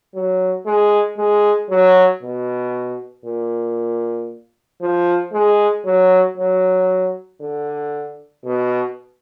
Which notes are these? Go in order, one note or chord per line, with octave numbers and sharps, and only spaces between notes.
F#3
G#3
G#3
F#3
B2
A#2
F3
G#3
F#3
F#3
D3
B2